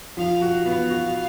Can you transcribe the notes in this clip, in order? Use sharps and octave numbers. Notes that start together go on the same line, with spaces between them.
F3 F5
F#4
B3 F5
F#4